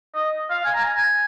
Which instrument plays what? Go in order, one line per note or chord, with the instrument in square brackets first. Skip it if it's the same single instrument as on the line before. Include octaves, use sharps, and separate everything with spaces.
[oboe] D#5
F5
G#5
A#5
G#5